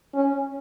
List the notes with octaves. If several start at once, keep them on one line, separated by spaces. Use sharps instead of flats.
C#4